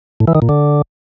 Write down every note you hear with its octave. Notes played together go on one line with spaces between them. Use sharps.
A2
E3
D#3
A#2
D3